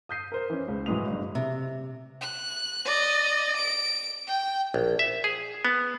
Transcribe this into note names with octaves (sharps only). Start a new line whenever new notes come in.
D#6 G6 C7 D#7
A#4 C5
E3 C#4
C#2
A2 E3 F#3 G#3 D#6 F7
G1
C3
F#6
D5 D#5
D7
G5
A#1
E5
G#4
B3